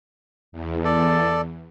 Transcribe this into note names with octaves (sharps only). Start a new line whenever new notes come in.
E2
A4 D5